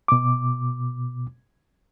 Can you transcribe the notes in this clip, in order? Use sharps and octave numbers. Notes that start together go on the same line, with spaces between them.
B2 D6